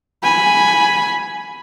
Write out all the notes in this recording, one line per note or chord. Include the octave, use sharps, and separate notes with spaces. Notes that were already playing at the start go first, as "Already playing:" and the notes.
G#5 B5